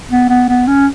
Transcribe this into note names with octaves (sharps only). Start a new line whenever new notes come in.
B3
B3
B3
C#4